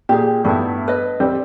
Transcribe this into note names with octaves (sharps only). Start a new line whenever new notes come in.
A#2 G4 G#4
G2 A3 B3 D#4 E4
B4 D#5
G3 C4